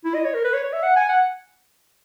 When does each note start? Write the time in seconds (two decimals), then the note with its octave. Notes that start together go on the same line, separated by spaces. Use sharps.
0.05 E4
0.15 D#5
0.25 C#5
0.34 A#4
0.44 B4
0.53 C#5
0.64 C#5
0.73 E5
0.83 F#5
0.96 G#5
1.09 F#5